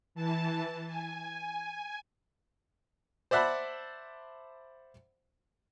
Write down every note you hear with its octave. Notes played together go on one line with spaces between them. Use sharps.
E3 A5
G#5
C5 D5 E5 F#5 A5 B5